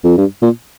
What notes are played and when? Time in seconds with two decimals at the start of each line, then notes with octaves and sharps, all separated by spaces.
0.04 F2
0.18 G2
0.42 A#2